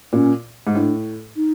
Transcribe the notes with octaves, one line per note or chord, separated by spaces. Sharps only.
A#2 C#4
G#2
A2 D4
D#4